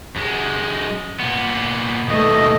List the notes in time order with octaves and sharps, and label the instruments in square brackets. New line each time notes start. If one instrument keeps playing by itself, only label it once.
[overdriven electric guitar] F#2 G#3
A#2 B3
[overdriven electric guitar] D#2 B2 [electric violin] A3 D#5